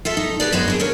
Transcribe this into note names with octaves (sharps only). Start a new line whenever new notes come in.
F4 A4 E5
D#4
G4 G#4 B4 D5
F#2 G#3 B3 C#5 D#5
D4 G#4
D#2 D#3 A#4 C#5